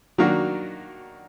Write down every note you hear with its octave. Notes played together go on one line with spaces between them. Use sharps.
D#3 F#3 A#3 D4 F#4